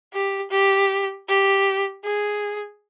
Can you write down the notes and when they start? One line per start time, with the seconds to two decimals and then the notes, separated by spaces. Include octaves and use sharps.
0.13 G4
0.51 G4
1.28 G4
2.04 G#4